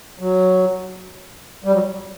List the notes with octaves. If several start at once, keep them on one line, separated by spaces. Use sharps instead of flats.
F#3
G3
F#3